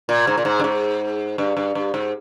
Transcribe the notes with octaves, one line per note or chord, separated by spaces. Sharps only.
A#2
G#2
A#2
G#2
G2
G#2
G2
G2
G2
G#2